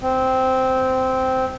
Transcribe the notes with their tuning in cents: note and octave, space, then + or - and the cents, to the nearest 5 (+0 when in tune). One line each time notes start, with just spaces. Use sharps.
C4 -10